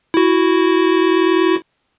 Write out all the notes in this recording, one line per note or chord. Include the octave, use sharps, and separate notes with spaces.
E4 F#4